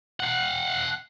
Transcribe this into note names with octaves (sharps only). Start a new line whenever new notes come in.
F5 F#5